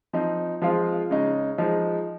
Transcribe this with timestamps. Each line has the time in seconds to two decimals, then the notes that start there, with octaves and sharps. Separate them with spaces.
0.13 F3 C4 D#4
0.62 F3 G#3 C4 F4
1.10 C#3 G#3 D#4
1.58 F3 G#3 D#4